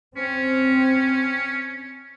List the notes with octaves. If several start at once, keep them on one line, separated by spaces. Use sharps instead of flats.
C4 C#4